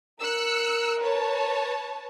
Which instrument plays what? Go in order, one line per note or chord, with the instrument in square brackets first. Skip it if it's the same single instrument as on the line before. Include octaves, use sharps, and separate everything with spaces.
[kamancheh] A#4 [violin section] E6 F#6 C#7
[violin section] B4 C#5 A5